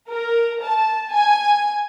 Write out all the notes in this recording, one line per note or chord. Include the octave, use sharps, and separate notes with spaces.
A#4
A5
G#5